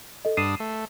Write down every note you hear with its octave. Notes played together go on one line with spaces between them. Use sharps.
A4 D#5
G2 D4 D#6 C7 D#7 E7
A3